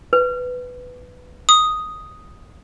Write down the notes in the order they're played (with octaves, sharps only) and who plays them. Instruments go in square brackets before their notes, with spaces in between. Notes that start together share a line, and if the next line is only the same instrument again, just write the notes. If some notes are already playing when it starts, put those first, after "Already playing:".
[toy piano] B4
[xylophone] D#6